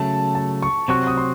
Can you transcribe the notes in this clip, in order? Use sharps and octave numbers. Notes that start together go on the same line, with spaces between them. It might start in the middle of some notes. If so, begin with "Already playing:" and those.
Already playing: C#3 F#3 A3 A5
A5
C#6
C3 F#3 C4 F#4 C#6
D#6
C6